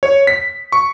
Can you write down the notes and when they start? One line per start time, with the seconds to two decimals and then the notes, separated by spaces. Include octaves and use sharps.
0.03 C#5
0.27 B6
0.72 C#6